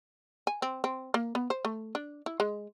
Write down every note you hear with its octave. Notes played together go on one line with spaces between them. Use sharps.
G#5
C4
C4
A#3
B3
C5
A3
D4
E4
G#3